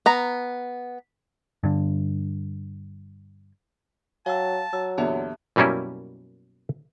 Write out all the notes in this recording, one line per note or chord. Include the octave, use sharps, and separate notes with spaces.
B3 A#5
G2 D3
F#3 F5 G5 A5 E6
F#3 E6
E2 A#2 D3 G4 E5 A5
F#2 B2 G3 A#3 C#4 E4